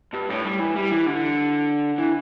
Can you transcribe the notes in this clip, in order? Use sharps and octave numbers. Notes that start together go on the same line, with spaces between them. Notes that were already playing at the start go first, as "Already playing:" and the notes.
G2
A2
G3
E3
G3
E3
D3
E3